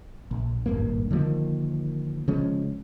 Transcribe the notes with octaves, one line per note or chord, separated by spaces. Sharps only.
A#1
D#1 G#1 G2 A#3
D3 D#3 F3 A#3
C#3 F3 G#3 C#4